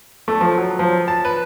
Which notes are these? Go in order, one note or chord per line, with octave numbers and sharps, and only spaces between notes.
A3
F3
F#3
F3
A5
B4